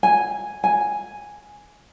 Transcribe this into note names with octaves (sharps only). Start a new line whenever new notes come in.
G#5
G#5